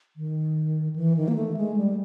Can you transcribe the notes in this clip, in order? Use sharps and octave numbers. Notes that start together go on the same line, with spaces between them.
D#3
E3
D#3
A#3
A3
G#3
G3